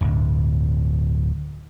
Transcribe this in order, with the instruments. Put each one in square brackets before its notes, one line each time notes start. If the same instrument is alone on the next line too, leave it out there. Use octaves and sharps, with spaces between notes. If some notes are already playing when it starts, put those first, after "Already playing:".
[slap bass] D1 D2 G2